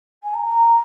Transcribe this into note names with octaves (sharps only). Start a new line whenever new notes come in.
G#5
A#5
A#5